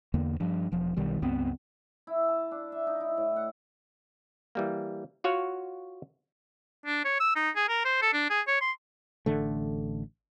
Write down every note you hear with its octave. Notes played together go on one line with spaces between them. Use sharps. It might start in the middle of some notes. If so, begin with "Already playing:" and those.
E2 D3 A#3
G2 F3
E1 F3
B1 D#3 G3
C#2 G2 B3 C4
E4
A5
D4
E5
D#4
E4
A2
F#5
E3 G3 A#3
F4 F#4 C#5 F5 F#5
D4
C#5
E6
D#4
G#4
A#4
C5
A4
D4
G#4
C#5
C6
A1 D3 A3